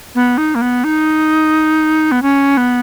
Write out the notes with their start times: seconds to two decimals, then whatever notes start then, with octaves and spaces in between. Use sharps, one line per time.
0.15 B3
0.38 D#4
0.55 A#3
0.61 B3
0.84 D#4
2.12 B3
2.22 C#4
2.57 B3